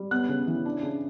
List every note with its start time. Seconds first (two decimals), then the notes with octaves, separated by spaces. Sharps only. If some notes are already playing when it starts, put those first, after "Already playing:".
Already playing: G3
0.11 B3 F#6
0.29 C#3
0.47 E3
0.65 D4
0.83 C#3